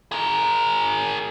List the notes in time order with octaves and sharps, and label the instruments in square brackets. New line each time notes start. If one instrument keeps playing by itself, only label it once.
[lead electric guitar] G#4 A#4